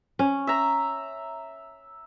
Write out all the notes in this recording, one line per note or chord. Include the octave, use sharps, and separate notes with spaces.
C#4
E5 A#5